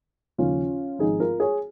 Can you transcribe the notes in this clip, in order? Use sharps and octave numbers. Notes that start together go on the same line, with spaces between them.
D#2 C#3 F3 C#4 F4
G#1 G#2 F3 D#4 G#4
F4 A#4
G#4 C#5